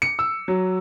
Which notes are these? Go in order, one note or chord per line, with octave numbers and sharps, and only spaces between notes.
C#7
E6
F#3